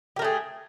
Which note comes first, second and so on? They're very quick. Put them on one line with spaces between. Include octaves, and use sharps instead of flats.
G4 A#4 A3 G#4